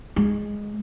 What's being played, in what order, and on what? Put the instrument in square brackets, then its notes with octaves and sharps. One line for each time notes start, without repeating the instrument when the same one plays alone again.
[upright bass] G#3